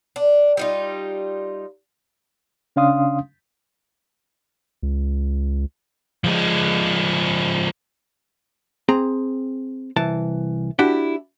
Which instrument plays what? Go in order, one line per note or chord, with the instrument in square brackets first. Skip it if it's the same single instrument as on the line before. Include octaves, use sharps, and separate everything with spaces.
[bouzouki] D4
G3 D#4 F4
[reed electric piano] C#3 C#4 D4 F5 C6 D#6
[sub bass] C#2
[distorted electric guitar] F3 G#3
[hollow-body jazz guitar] C4 G#4 A#5
C2 E3 A5
D4 E4 F#4 G4